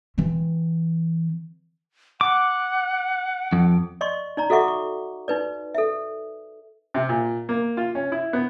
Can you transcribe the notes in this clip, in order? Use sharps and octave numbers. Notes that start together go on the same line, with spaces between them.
E3 C4
F#5 D6
F2
D5 D#5 C6 C#6
D#4 D5 A#5
F#4 A4 E5 F#5 C#6 D6
C#6
D#4 B4 D5
A4 E5
C3
A#2
A#3
F4
C#4
E4
B3